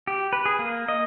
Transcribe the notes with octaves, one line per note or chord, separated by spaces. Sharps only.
G4
B4
G#4
A#3
D#5